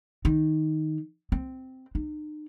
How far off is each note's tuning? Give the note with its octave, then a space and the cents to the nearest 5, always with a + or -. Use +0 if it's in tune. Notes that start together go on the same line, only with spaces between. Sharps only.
D#3 +0
C4 -10
D#4 -45